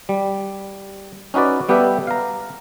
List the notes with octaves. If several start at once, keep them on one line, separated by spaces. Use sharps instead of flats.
G3
C#4 D#4 F#4 B4 D5
G3 B3 G4 A4 B4 E5
F5 A#5